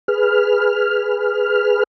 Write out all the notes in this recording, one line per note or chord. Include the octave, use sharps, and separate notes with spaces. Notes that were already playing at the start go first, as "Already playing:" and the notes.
G#4 B4 F6